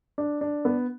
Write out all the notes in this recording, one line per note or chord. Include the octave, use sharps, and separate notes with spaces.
D4
D4
B3